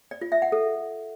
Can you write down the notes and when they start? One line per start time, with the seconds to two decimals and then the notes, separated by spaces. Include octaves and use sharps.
0.11 D5
0.22 F4
0.32 E5
0.42 F#5
0.52 A4